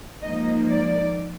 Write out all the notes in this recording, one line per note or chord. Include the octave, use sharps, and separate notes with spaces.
G#2 F3 A#3 D#4 D#5
D5